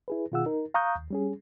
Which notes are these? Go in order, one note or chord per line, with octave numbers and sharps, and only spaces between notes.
E4 G#4 B4
B2 D#3 F4 G#4 F#5 E6
D#4 A#4
F5 A#5 C#6 D#6 F#6 G6
D#2
G3 C#4 G#4